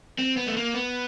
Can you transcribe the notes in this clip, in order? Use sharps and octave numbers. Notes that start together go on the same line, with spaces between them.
C4
B3
A3
A#3
B3